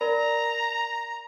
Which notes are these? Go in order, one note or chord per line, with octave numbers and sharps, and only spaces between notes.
A#4 D5 A#5 B5